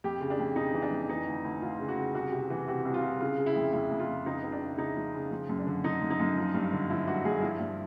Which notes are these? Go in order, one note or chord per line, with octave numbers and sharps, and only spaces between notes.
F2 G4
C#3
D4
F2
C#3 D#4
E3
D4
F2
E3 D#4
D2
D2
D2 F4
C#3
F#4
C#3
C2 F#4
C3
E3
C3 F#4
C2
F4
C2
C#3 F4
C#3
E4
F2
F2 E4
F2
F4
F2
C#2 D#4
C#2
D4
C#2
E4
C#3 D#4
F3
C#3
F3
F#2
D4
D3
D3 D#4
F#2
D#4
F#2
F3
G2
D3
F3 E4
G2 F#4
G2 G#4
F3 E4
G2